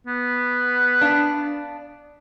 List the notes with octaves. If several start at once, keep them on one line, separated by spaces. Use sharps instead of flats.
B3
D4 F5